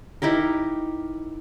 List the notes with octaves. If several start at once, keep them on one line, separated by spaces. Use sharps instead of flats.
D#4 E4 G4 A#4